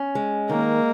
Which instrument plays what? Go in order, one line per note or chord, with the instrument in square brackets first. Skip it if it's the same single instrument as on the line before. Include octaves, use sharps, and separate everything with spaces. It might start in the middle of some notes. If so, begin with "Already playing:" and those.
Already playing: [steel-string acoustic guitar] C#4
G#3
[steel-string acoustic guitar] D#3 [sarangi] A#3